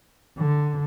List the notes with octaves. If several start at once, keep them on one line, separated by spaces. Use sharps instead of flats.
D3